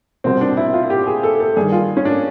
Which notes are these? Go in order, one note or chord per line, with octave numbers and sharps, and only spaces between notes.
C2 B2 C4
D4
E4
F4
G4
G#4
A4
A4
G2 D#3 G#4
F4
C#4
D4